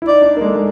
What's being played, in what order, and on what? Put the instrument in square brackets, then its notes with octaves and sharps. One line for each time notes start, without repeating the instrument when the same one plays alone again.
[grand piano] E4
[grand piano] D#4 [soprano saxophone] D5
[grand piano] D4
A#3
G#3
A3
G#3